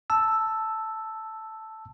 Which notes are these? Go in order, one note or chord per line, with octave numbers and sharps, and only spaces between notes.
A5 E6